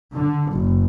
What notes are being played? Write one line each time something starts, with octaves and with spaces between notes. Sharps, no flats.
D3
F#1